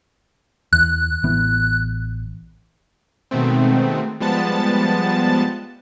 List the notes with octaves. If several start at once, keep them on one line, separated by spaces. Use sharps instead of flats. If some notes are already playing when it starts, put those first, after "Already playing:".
E2 F#6
A1 E3 B3
B2 D#3 G#3 A3 C4
F3 G3 G#3 B3 A5 A6